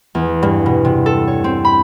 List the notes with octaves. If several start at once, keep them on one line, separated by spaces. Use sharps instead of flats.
E2
G2
B2
C3
A4
C#5
C4
B5